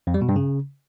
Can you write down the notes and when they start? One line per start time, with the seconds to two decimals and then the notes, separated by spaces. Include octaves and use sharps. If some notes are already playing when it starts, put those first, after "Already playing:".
0.07 F2
0.14 G3
0.22 B2
0.29 G2
0.36 C#3